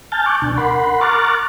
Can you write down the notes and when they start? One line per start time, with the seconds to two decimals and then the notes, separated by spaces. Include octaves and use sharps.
0.12 G#5 A5 F6 G6 A6
0.26 C#6 D6 F#6 G6
0.42 D2 B2 D4
0.58 A#4 F#5 B5 C6
1.01 A#5 C#6 D6 F6 F#6 A6